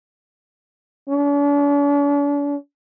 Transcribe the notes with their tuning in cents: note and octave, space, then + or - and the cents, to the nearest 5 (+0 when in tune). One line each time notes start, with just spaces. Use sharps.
D4 -45